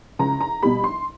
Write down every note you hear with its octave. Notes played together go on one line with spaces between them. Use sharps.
C#2 A#5
A#5
B2 G3 B5
C6